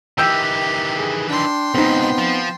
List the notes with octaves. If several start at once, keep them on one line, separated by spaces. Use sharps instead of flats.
D#3 E3 G4 G5 E6 G6
G#4
D4 G5 C6
C#2 B2 B3 C4 D#4
F3